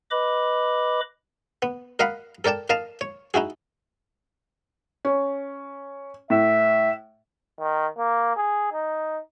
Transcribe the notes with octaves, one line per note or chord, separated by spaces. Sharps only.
B4 D#5 B5 D6
B3
A#4 D#5 F5 F#5 B5
A4 A#4 D5 G5 A5
A#4 D#5 F5 A5 A#5
C#5
D#4 E4 F#4 G#4
C#4
A2 E5
D#3
A#3
G#4
D#4